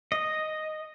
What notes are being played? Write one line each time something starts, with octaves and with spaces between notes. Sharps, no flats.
D#5